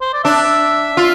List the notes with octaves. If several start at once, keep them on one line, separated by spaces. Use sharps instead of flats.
C5
D5
D4 E5
F4